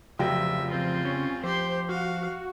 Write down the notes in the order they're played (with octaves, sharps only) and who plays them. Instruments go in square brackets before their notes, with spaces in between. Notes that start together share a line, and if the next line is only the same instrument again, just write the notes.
[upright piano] F1 F#3 G5 [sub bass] C#3 [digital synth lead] F3 [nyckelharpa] E5
[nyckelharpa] C4 F4
[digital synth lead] C#4
[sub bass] F3 [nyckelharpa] G4 C6 [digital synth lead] C5
[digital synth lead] F#4 [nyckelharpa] F5